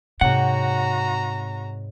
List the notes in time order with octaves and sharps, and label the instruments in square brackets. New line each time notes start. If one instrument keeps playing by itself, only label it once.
[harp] G#2 C#5 G5 [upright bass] C3 [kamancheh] F#4 A#5 [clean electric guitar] F#5